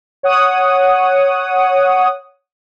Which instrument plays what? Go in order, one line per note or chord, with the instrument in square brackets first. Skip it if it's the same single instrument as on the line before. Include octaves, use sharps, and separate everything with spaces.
[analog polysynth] C#5 F#5 D#6